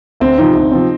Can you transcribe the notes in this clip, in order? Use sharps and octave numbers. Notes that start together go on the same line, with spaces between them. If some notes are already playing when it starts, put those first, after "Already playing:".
D2 C4
C3 F3 C4 D#4
D2
C3 F3 C4